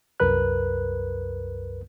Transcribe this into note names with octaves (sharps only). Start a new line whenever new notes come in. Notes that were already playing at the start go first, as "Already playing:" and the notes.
C2 F#2 A#4 B4 F#6